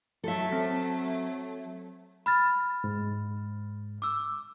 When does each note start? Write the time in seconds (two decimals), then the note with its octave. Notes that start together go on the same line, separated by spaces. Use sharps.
0.24 F#3 A3 A4 E5
0.52 C4
2.26 B5 F6 A6
2.84 G#2
4.02 D6 E6